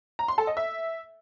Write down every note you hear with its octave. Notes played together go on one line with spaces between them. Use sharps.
A#5
C6
A4
D#5
E5